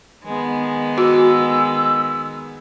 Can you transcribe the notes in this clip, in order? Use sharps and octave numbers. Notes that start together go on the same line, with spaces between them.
D#3 G#3 B3
F#4 E6